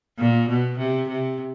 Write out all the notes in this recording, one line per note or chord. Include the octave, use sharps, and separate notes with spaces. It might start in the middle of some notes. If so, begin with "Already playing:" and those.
A#2
B2
C3
C3